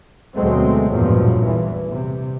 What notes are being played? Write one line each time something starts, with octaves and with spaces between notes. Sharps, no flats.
D2 B2 F#3 G#3 A3 C4
A1 E2 G2 A#2 F3 F#3
E2 E3
C3